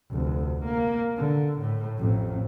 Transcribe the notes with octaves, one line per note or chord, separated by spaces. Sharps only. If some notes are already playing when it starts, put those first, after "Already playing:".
F1 D2
A#3
D3
A2
A1 F2